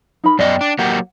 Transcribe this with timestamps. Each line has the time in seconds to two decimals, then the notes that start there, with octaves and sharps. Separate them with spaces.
0.24 D#4 A#4 B5
0.39 F#2 B3 D5 D#5 G5
0.61 D4
0.79 F#3 A#3 G4 F#5